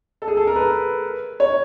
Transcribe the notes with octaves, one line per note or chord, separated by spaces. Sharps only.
A4
G#4
A4
A#4
B4
C#5